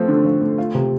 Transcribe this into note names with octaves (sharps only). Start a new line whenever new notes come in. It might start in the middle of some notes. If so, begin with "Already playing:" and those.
Already playing: F3 A3 C4
D3
F3
A3
F4
C3